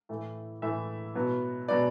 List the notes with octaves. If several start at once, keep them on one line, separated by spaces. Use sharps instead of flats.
A2 E3 A3
A2 E3 A3 E5
B2 F#3 B3
B2 F#3 B3 D5